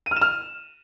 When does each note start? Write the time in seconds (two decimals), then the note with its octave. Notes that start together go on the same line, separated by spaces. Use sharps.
0.06 D#7
0.11 F6
0.16 E7
0.21 F6